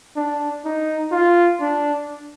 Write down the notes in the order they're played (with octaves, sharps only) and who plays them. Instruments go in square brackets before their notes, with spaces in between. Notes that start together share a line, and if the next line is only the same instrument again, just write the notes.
[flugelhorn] D4
D#4
F4
D4